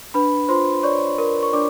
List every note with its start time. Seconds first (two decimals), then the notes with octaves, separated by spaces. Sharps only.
0.14 D4 B4 B5
0.49 F4 C5 C6
0.83 C#5 D5 C#6
1.18 A#4
1.43 C#6
1.53 D4 D5 D6